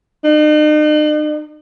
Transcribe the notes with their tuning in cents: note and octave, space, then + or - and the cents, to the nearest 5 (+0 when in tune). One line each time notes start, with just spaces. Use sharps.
D#4 -45